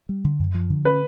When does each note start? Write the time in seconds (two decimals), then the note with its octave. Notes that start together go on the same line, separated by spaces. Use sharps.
0.09 G3
0.24 D3
0.39 F#2
0.55 F3
0.70 D3
0.85 C#4 B4